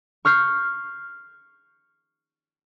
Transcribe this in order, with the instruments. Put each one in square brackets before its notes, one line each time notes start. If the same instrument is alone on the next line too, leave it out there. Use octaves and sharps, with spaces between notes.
[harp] C#6 F6 G6 C7